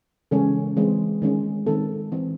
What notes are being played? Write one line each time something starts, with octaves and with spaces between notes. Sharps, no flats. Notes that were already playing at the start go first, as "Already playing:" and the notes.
C#3 E3 G#3 C#4 A4
E3 G#3 C4
D#3 G#3 C#4
D#3 G#3 C4 A4
E3 C4